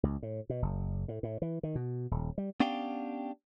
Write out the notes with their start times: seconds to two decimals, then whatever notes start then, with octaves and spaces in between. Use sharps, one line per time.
0.03 C#2
0.23 A2
0.50 B2
0.62 F#1
1.08 A2
1.23 A2
1.42 E3
1.63 D#3
1.75 B2
2.11 D#1
2.38 G3
2.60 B3 C#4 D4 G4 F5 G5